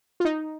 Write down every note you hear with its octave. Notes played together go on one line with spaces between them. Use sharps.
F4
D#4